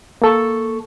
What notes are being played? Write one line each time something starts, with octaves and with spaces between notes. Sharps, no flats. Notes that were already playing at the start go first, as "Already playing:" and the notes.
A#3 A4 C#6